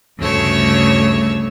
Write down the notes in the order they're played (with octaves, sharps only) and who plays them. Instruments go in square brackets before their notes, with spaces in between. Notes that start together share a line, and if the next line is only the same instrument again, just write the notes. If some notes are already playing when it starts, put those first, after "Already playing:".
[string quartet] D2 G2 C#3 A3 C#5 E6